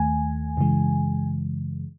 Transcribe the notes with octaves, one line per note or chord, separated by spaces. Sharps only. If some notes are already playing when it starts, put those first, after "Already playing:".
Already playing: D#2 D#3 A3 G#5
F#2 C#3 E3 G#3